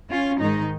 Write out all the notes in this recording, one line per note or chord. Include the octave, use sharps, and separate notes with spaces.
C#4 F4
G#2 D#3 G#3 D#4